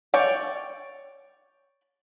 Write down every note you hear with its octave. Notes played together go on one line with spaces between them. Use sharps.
C#5 D5 G5